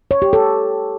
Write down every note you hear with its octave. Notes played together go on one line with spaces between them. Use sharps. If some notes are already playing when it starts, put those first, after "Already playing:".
C#5
G4
A4